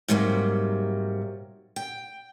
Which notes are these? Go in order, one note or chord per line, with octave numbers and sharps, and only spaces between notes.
G#2 C3 F#3 G3 A3 A#3
G5